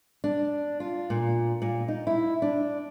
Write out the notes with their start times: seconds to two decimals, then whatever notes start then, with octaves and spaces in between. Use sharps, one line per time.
0.24 D4
0.80 F4
1.10 A#2
1.62 A#2
1.88 D#4
2.07 E4
2.42 D4